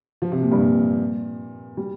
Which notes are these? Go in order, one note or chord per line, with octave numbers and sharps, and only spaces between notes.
F3
C3
A#2
G2
A#2
G3